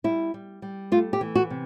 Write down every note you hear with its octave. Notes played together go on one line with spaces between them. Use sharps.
G3 E4
G3
G3
A3 F4
G4
E3
F#4
C3